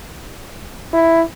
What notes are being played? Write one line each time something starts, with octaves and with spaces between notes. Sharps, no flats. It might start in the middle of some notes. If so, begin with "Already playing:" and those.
E4